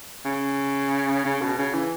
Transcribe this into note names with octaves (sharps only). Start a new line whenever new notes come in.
C#3
C#3
B2
C#3
E3